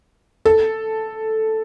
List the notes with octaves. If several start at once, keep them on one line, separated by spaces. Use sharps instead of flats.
A4